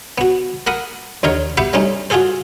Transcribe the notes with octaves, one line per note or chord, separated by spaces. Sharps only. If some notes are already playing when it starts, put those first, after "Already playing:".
B3 F#4
A#3 A#4 F#5 B5 D#6
D#2 D3 D#4 A#4 C#5
B3 G4 B4 E5 F#5 G5
G3 A3 C4 C#4 D#4
F4 F#4 G#4 A4 C5